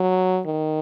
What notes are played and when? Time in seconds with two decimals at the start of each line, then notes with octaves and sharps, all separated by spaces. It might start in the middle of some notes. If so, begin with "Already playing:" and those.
Already playing: F#3
0.45 D#3